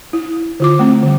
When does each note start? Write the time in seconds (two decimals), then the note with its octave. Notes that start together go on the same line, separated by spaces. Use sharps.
0.13 E4
0.60 D3 F4 D6
0.79 A3 C4
1.03 D3 G3